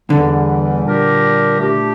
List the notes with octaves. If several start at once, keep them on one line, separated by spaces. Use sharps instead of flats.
E2 D3 E3 G3
A#2 G3 D4 G4 A#4
A#2 A3 D4 G4